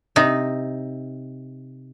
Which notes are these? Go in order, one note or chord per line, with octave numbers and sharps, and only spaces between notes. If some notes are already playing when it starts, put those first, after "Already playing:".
C3 D#4